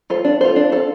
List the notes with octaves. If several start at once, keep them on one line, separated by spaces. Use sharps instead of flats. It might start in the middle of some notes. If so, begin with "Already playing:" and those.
F4 A4 C5
D4
F4 A4 C5
D4
F4 A4 C5